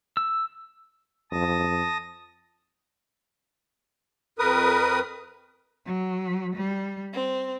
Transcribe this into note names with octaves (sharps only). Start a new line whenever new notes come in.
E6
F2 A5 D#6 A#6
F2 A#4 B4 D#6
F#3
G3
C4